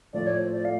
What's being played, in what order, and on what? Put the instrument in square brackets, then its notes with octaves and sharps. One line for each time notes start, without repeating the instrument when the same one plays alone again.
[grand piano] A2 F3 A3 [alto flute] D5
[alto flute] C#5
C5
D5
[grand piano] A3 [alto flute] F5